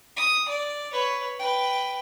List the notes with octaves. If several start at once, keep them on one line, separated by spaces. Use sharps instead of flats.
D#6
D5
B4 C#5
B4 G5